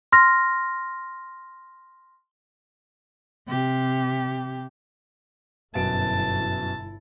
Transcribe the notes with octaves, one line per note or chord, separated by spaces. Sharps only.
C6 F6 A#6
C3 G4
G1 F#2 B2 E4 A5 D7